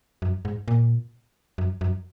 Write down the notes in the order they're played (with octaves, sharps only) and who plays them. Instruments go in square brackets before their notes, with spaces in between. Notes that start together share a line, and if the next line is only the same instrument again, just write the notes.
[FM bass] F#2
G#2
A#2
F#2
F#2